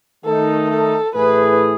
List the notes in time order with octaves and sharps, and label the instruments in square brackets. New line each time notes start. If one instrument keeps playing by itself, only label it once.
[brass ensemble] D#3 A3 D#4 [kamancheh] A4
[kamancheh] A4
[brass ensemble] A2 E3 A3 E4 G#4 [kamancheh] B4